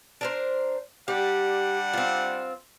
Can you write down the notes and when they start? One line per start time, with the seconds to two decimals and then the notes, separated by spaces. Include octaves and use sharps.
0.21 D4 A#4 C5
1.08 G3 D4 G4 F#5
1.94 C4 F4